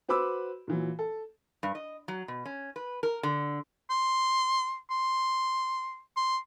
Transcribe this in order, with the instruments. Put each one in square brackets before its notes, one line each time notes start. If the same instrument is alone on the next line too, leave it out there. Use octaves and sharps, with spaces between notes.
[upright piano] F#4 B4 C5 B5 D6 E6
A#2 E3 F#3
A4
[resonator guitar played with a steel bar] G2
D#5
F#3
B2
C#4
B4
A#4
D3
[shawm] C6
C6
C6